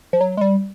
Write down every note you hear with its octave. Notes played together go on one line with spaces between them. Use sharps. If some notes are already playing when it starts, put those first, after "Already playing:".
F3
F#3
G#3
G3